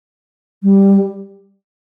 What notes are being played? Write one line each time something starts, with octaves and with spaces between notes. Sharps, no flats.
G3